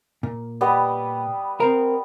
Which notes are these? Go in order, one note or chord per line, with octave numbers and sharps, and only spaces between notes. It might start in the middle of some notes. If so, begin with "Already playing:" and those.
A#2
G3 B3 D#5
C4 A#4